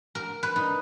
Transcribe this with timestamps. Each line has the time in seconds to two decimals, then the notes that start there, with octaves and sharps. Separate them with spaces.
0.15 A#4
0.43 B4
0.56 D#4